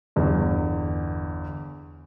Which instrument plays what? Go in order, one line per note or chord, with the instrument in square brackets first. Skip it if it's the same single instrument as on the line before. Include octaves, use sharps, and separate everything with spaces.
[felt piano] G1 E2